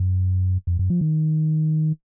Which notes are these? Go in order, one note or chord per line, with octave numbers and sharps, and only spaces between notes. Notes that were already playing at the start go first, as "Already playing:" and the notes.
Already playing: F#2
F2
F#2
F3
D#3